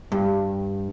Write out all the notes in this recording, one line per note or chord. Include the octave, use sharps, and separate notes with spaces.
G2